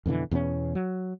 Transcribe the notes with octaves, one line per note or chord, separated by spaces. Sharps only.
F2 B2 D3 E3
E2 B2 B3 C#4
F#3